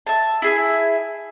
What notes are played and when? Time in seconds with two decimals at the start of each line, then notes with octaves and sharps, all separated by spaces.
0.07 E5 A5
0.42 E4 G#4 E5